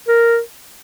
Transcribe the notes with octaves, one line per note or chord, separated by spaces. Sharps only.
A#4